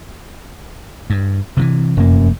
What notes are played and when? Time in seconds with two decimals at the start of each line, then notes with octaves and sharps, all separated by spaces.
1.10 G2
1.57 C3 D#3 E3
1.97 F1 F#2 A#3